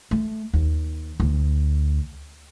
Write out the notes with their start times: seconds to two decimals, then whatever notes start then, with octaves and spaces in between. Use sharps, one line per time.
0.11 A3
0.54 D#2
1.20 D2